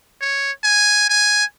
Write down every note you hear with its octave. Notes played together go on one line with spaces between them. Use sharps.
C#5
G#5
G#5